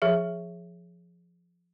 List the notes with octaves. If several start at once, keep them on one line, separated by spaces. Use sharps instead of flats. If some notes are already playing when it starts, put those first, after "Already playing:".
F3 G#4 E5